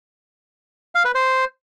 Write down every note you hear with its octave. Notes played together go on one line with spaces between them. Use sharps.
F5
B4
C5